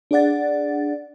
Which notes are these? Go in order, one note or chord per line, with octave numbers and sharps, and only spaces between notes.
D4 G#4 D5 F#5 A6